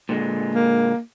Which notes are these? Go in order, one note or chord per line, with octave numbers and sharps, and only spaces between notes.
A#2 D3 G#3
A#3